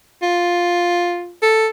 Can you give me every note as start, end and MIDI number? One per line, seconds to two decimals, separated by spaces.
0.22 1.33 65
1.42 1.68 69